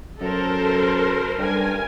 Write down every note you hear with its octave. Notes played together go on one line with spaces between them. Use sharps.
F#2 A4 A#4 C5
G2 A#4 G#5